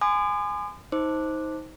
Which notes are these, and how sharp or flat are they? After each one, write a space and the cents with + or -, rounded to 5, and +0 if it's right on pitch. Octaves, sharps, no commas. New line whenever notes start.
G#5 +0 C6 -40 D#6 -45
D#4 +25 C5 +5 D6 +0